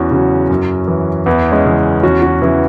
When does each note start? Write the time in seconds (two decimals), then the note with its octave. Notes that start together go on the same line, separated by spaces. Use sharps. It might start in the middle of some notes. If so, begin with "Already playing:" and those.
Already playing: E2 C#4 F#4
0.11 C#3 F#3
0.50 F#2
0.88 E3
1.26 E2 B3 E4
1.51 G#3 C#4
1.65 C#3 E3
2.03 E2 C#4 F#4
2.22 C#4 F#4
2.42 C#3 E3 B3 E4